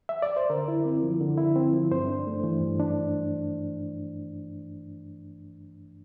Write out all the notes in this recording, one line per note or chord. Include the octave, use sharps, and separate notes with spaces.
E5
D5
C5
D3 A#4
E4
C4
F3
D3
E4
C4
F3
G2 C5
D4
A3
E3
G2
D4